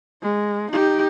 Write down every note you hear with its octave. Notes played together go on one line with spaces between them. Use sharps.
G#3
D#4 G4